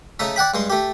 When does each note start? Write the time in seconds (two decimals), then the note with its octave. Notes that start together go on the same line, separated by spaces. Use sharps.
0.19 C#3 A3 D#4 E5
0.36 D5 F#5 G5 B5
0.54 G2 G#3 C6
0.70 A3 G4